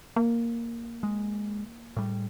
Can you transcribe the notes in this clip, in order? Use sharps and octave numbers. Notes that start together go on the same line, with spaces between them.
A#3
G#3
A2 G3